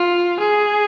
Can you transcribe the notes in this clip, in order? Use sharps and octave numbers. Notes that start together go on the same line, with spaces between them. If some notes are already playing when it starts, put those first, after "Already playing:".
Already playing: F4
G#4